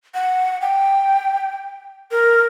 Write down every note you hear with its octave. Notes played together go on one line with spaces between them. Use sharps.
F#5
G5
A#4